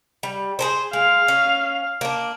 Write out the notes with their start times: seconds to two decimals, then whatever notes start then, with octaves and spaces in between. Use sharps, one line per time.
0.23 G3
0.59 G#4 A#4 C5
0.93 G#3 F5
1.28 C#4
2.01 A#3 D4